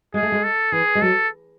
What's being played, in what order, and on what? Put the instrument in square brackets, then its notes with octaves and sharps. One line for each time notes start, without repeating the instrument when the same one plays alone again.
[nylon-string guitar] G#3 [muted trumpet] G#4
[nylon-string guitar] A3
G#3
[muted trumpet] A4
[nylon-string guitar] E3 [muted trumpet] G#4
[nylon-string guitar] G#3
[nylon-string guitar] F#3 [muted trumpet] A4